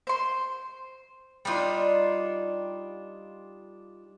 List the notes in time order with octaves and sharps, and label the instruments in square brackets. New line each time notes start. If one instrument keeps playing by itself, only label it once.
[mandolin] C5 C6
[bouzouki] G3 D4 D#4 F4